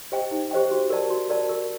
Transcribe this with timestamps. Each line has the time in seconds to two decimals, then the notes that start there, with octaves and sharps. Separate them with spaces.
0.12 G4 C5 D#5 G5
0.31 D#4
0.51 G4 C5 D#5 G5
0.71 F#4
0.90 A#4 D5 A5
1.10 F#4
1.30 A#4 D5 A5
1.49 A#4